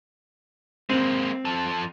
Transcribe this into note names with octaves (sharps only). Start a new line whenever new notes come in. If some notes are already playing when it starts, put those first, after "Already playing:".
G#3 A#3 C4
F3 A4